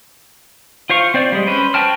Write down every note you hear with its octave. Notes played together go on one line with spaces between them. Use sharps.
F4 C5 F5 C#6
C4 C5 D5 G6
G3 G#3
C#4 B4 C5
F#4 C5 G5 A5 F6